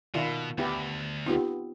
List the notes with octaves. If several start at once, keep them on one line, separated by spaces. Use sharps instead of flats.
B2 D#3 E4 F4 D5
D2 B3 E4 G4
B3 C4 D#4 F4 G4